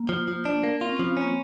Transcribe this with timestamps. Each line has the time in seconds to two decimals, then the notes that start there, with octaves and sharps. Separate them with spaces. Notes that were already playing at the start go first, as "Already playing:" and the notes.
Already playing: A#3
0.09 F3
0.28 F3
0.45 D4
0.63 A#3
0.81 C4 F4
0.89 C#4
0.97 C4
0.99 F3
1.05 B3
1.17 A#3 C#4